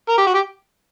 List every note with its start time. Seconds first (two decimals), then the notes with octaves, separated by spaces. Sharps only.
0.09 A#4
0.18 G4
0.27 F#4
0.34 G4